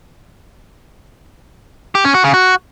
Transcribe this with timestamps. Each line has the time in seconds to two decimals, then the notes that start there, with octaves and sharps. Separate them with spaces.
1.95 G4
2.05 C#4
2.14 F#4
2.24 C#3
2.34 F#4